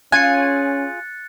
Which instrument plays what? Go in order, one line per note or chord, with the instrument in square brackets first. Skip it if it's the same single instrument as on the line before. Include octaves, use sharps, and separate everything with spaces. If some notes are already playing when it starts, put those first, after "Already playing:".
[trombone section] C#4 [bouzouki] F4 G#4 [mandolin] G#5 [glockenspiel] F#6 A6 C#7